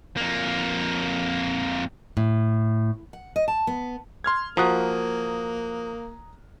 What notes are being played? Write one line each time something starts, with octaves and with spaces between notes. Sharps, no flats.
F2 A#3
A2
F#5
D#5
A5
B3
C6 F6 G#6
F3 A#3 F#4 A#5 D#6 F#6